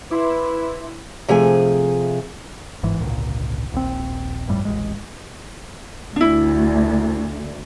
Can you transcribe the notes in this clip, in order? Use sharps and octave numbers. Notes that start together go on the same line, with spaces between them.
E4 B4 E5 C6 D6
C3 F3 A3 G#4 G#5
G1 G#2 E3
G#1 C#2 A#2 D3
D#1 A#1 C4
G1 F2 A2 G3
D#1 A1 G#3
D2 D4 E4